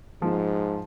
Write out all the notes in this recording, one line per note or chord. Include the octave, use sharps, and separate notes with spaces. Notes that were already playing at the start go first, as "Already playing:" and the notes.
G#2 F3